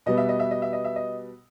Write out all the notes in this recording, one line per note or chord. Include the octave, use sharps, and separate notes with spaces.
B2 G3 B3 D#5
E5
D#5
E5
D#5
E5
D#5
E5
D#5